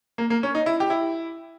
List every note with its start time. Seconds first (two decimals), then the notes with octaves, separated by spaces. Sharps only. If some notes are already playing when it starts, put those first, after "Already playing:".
0.18 A#3
0.30 A#3
0.43 C#4
0.55 D#4
0.66 E4
0.80 G4
0.90 E4